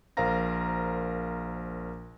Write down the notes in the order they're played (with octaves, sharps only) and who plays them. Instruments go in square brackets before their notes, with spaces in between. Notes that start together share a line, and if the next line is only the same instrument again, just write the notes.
[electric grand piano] A#1 A#4 C5 F5 A#5 A#6